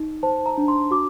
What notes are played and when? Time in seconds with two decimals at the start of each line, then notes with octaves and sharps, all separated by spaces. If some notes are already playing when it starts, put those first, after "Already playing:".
Already playing: D#4
0.23 C5 A5
0.46 A#5
0.57 D4
0.68 C6
0.91 F#4 D6